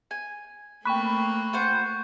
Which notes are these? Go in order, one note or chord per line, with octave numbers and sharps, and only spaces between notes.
G#5
A3 A#3 C4 G5 B5 C#6 F#6
F4 C5 F#5